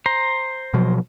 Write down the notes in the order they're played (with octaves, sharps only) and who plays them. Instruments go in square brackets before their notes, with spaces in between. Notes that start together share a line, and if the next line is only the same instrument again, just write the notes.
[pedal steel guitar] C5 A#5
[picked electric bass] B2 F3 F#3